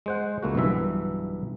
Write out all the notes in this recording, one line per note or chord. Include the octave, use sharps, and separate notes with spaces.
G#3 C5 F#5
C#2 A3 A#3 F#4
B1 G2 E3 E5